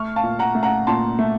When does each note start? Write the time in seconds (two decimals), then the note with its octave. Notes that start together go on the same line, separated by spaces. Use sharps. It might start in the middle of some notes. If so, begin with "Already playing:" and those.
Already playing: A3 C#6 F6
0.16 F5 A5
0.23 A#2
0.39 F#5 A#5
0.55 A3
0.63 F#5 A#5
0.87 A#2 A5 C6
1.19 A3